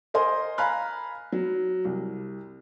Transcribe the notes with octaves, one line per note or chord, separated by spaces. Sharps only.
A#4 C5 D#5 G#5 C6
F5 G#5 A#5 B5 F6 F#6
F#3
C2